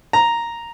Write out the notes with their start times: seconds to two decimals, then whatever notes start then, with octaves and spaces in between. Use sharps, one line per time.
0.13 A#5